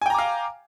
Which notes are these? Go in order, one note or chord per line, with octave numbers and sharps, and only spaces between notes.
F5 G5 G#5 A#5 D6